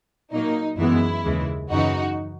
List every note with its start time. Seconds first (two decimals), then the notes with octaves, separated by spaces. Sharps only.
0.31 A#2 F#3 A#3 D#4
0.78 F#2 E3 G#3 B3 E4
1.24 D#2 C#3 E3 G#3
1.70 F#2 C#3 E3 D#4 F#4